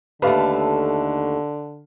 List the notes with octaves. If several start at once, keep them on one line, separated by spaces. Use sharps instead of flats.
D#2 D3 A3 B4 F5